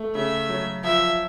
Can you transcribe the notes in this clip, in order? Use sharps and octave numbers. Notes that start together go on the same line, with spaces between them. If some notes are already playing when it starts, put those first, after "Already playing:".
Already playing: A3
C#3 E5
F#3
F3 E5